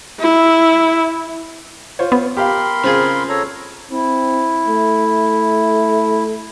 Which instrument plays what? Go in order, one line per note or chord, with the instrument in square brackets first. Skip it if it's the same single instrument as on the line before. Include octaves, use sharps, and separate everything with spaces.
[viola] E4
[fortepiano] F4 C5 C#5
[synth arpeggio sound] B3
[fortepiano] G4 F5 [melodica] A#4 B5 C6
[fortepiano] C#3 [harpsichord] C4 F4 G#4
[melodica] A4 C#5 A#5
[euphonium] C4 [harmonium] E4
[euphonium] A3